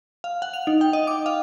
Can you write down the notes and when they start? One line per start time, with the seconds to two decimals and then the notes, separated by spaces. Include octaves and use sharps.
0.24 F5
0.42 F#5
0.54 F7
0.67 D#4
0.81 G5
0.93 D#5
1.07 D6
1.26 F5